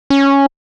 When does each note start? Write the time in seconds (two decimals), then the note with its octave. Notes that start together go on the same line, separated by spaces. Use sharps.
0.10 C#4